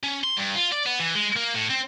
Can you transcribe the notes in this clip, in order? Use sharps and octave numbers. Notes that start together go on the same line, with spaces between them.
C#4
C6
G2
F4
D5
B3
E3
G#3
A#3
A2
C4